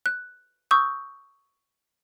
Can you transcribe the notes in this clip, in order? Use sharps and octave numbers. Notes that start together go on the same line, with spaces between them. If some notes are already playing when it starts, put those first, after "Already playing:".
F#6
C#6 D#6 E6 G6